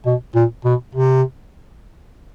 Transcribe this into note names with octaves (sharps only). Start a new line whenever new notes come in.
B2
A#2
B2
C3